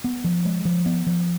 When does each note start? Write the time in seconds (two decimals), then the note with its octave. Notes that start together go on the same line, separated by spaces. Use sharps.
0.04 B3
0.24 F3
0.45 G#3
0.65 F3
0.86 B3
1.07 F3